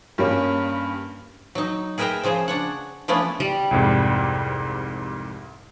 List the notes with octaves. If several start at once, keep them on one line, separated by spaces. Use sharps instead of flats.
G2 G3 A#3 C#4
F#3 D#4
G#4 A#4 B4 E5 G5 A#5
C#3 F3 G#4 C5
D4 C#5 F#5
F3 A3 B3 C#4 D4 E4
G3
C2 F2 G#2